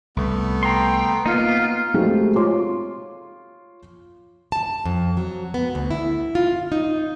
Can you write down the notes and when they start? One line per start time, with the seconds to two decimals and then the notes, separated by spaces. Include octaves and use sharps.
0.17 C2 A3 B3
0.63 G5 A#5 C6
1.26 A#3 B3 D#4 F4
1.94 G#3 A3 C4 D#4 F#4 G4
2.36 F4 C#5 C6 D6
4.52 A5
4.85 F2
5.17 F#3
5.54 B3
5.75 D2
5.91 E4
6.35 F4
6.72 D#4